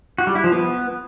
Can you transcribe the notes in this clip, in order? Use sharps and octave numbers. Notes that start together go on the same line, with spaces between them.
F#4
G3
E4
F3
B3